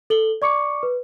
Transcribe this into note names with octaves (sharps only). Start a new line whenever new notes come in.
A4 F#7 G7
D5 C#6 D6 C#7
B4